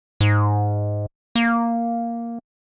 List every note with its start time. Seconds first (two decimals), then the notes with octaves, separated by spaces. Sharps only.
0.21 G#2
1.35 A#3